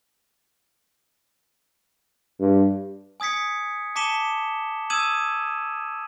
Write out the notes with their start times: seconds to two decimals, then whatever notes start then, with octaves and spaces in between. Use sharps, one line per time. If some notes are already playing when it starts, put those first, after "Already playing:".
2.40 G2
3.20 G#5 D#6 G#6 B6 C#7
3.96 A5 D6 B6 C#7 E7 G7
4.90 D#6 E6 G#6 D#7 E7 F#7